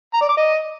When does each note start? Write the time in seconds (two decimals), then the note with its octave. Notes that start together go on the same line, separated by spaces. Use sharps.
0.14 A#5
0.21 D5
0.29 D6
0.37 D#5